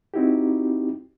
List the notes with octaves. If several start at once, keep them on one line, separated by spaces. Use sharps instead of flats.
C4 D#4 E4 F#4 G4